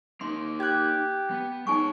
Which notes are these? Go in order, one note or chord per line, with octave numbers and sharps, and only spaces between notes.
A#3 D#4 C6
G4 F#6 G#6
B3
G#3 D#4 C#5 G#5 C#6